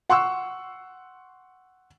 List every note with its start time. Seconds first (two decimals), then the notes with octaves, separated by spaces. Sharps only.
0.10 F#5 C6 C#6 E6